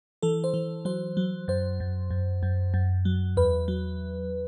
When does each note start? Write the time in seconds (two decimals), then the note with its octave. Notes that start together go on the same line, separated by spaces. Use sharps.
0.23 E3 A4
0.44 C5
0.54 E3
0.85 F#3 C5
1.17 F#3
1.48 F#2 C5
1.80 F#2
2.11 F#2
2.43 F#2
2.74 F#2
3.05 F#3
3.37 E2 B4
3.68 F#3